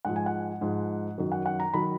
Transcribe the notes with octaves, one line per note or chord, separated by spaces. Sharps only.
G#2 F3 G#3 F#5
G#5
F#5
G#2 F3 G#3
F#2 D#3 F#3
F#5
F#5
A#5
D#3 F#3 B5